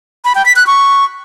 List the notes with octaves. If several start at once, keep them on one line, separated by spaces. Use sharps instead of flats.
B5
G5
B6
F#6
C#6